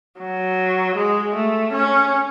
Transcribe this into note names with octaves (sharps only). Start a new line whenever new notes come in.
F#3
G#3
A3
C#4